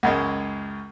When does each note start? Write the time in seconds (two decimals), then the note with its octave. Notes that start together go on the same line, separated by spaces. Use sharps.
0.03 C#2 F#2 G#3